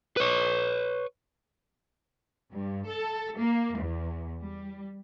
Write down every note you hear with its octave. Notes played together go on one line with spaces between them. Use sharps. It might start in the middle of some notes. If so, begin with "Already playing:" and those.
B4 C#5
G2
A4
A#3
E2
G3